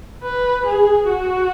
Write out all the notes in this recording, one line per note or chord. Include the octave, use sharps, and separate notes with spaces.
B4
G#4
F#4